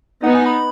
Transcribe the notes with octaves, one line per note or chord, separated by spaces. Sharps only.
B3 D#4 F#5
G#5
B5